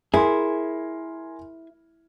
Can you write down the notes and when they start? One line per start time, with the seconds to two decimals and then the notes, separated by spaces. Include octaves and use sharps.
0.14 E4 G#4 A#4 G#5 C6